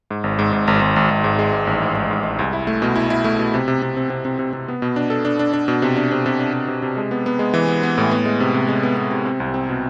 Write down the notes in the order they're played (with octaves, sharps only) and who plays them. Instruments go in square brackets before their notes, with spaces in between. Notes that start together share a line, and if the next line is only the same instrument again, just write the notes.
[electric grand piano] G#2
G#1
G#2
G#2
G#1
G#1
G#1
G#1
G#2
G#3
G#2
A1
G#2
G#3
G#2
G#3
C2
E4
A3
B2
E4
E4
A3
B2
C3
C3
C3
C4
C3
C3
C3
C3
B3
B2
D4
A4
D4
D4
D4
B2
C3
D4
C3
C3
D4
C3
C3
C3
G#3
B3
B3
G#3
E3
B3
B3
A2
B3
G#3
C3
C3
G#3
B3
B3
C3
C4
C2
C4
B2